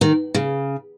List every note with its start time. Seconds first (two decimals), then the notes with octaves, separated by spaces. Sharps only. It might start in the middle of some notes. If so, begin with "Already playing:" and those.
0.01 D#3
0.34 C#3